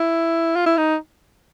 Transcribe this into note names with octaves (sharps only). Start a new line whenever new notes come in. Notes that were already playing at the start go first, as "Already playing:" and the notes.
Already playing: E4
F4
E4
D#4